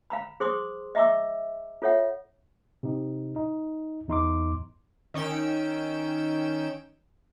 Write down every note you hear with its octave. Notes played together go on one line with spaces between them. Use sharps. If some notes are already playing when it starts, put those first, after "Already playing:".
F5 A#5 B5
G#4 C5 C6 C#6 D#6
D#5 E5 A#5 C#6 D6 E6
F4 A4 C#5 E5 F#5
C3 D#4
D#4
E2 D#4 C6 D6
D#3 C#4 G5 E6 D7